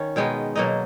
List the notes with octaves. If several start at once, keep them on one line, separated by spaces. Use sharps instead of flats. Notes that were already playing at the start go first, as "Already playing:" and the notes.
Already playing: D#3 C#4
B2 G#3 B3 D#4 G5
B2 F#3 A#3 D#4 D#5